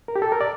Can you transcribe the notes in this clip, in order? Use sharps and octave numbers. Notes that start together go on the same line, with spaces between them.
A#4
G4
A4
A#4
D5